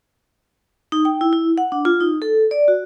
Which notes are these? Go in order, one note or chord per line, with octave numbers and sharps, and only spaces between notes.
D#4
G5
E4
E4
F#5
D4
F4
D#4
A4
D5
F#4